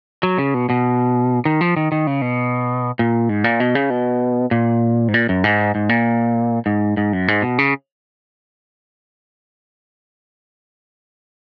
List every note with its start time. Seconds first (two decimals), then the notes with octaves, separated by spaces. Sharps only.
0.23 F#3
0.38 C#3
0.54 B2
0.70 B2
1.45 D#3
1.61 F3
1.77 D#3
1.92 D#3
2.07 C#3
2.22 B2
2.99 A#2
3.29 G#2
3.44 A#2
3.60 B2
3.75 C#3
3.90 B2
4.51 A#2
5.08 G#2
5.14 A#2
5.29 F#2
5.44 G#2
5.75 G#2
5.89 A#2
6.66 G#2
6.97 G#2
7.13 F#2
7.28 G#2
7.42 B2
7.58 C#3